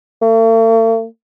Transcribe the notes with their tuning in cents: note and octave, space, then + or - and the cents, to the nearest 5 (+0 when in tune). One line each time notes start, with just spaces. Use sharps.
A3 +45